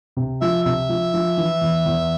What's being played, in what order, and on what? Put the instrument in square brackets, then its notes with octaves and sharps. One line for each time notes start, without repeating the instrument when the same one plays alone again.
[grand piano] C3
[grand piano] F3 [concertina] E5
[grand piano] C3 [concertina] E5
[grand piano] F3
F3
E3
E2
E2